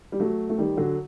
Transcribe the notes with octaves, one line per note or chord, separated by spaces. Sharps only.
G3
F#3 A3
A3
D#3 G3
D3 F#3